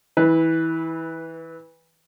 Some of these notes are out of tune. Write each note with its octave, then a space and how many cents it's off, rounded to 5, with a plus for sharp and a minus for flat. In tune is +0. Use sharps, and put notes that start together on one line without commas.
E3 -25 B4 +0